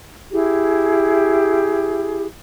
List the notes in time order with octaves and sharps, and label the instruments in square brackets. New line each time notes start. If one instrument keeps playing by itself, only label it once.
[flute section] E4 G4 G#4